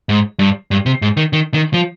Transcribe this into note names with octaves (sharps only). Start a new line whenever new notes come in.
G#2
G2
G2
C3
G#2
D#3
D#3
D#3
F3